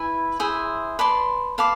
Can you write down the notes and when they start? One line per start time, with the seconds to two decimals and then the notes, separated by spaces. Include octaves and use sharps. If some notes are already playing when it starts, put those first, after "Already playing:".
Already playing: E4 B4 E5 G#5
0.40 E4 G#4 C5 E5
0.99 B4 D5 A5 C6
1.58 B4 F5 A5 D6